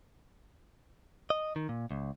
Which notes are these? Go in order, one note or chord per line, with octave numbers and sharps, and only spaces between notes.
D#5
D#3
A#2
C#2